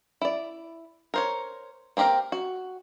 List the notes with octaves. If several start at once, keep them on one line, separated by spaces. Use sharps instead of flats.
E4 D5
A#4 C5 C#5
A#3 C4 G4 A#4 F5
F#4